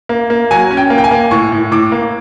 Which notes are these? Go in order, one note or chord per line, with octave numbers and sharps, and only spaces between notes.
A#3
A#3
F#3 G#5
C#4
G5
A#3
G5
G#5
A#3
A2 C#6
A2
A2 D6
A#3